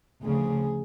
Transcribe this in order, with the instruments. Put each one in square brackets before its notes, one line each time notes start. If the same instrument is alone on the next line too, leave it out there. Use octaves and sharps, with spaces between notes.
[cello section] D2 C#3 F3 [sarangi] G#4